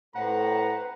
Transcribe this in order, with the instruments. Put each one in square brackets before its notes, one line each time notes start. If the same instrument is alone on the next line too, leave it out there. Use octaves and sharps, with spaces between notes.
[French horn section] A2 [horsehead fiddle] B4 C5 [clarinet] F#5 [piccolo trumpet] A#5